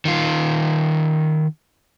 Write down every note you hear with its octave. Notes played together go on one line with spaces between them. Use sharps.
D#3 F4